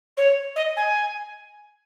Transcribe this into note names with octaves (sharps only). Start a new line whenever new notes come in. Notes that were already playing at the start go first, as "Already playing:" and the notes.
C#5
D#5
G#5